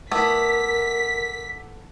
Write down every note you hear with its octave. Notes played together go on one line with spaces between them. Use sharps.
A3 B3 E4 A#4 F#5 D6 E6 B6